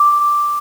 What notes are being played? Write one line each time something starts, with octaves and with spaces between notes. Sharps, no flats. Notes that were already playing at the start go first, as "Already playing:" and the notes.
Already playing: D6